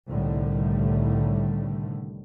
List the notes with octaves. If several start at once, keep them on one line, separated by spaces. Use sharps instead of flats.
C2 A2 D3 D#3 G3 A3